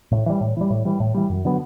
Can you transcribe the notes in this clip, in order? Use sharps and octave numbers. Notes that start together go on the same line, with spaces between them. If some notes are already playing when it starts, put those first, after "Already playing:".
A2
E3 G3
A2
E3 G3
A2
E3 G3
A2
E3 G3
F#2
D3 F#3 B3